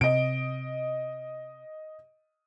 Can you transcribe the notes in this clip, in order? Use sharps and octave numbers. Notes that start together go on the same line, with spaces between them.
C3 D#5 D7